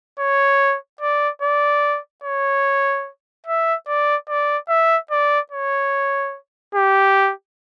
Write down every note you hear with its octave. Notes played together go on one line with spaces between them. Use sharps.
C#5
D5
D5
C#5
E5
D5
D5
E5
D5
C#5
G4